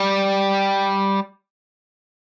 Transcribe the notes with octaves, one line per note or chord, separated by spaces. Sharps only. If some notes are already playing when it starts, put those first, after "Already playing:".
Already playing: G3